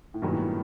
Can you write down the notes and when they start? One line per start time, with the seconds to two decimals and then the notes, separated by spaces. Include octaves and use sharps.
0.14 A2
0.22 G2 A#2 D#3 F#3 B3
0.32 A2
0.42 A2